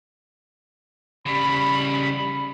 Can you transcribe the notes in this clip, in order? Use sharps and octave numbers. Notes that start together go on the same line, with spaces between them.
C#3 G3 B5